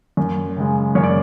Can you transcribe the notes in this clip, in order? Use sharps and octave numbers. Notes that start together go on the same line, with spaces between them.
F#2
C#3 G#3
F#2 C#5
D5